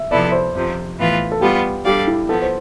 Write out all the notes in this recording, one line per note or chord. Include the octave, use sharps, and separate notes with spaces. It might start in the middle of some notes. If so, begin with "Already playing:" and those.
Already playing: E5
C3 F3 B3 E4 A4 D5
C5
F2 C3 F3
A2 E3 B3 F4 B4
A4
G3 B3 F4 G4
G3 D4 G4 A4 D5 F5
E4
F3 B3 A4
C5